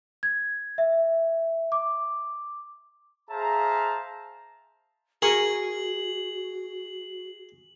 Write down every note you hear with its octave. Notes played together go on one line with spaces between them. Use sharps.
G#6
E5
D6
G#4 C5 E5 F5 A5 A#5
F#4 G#4 A#4 G#5 C#6 F#7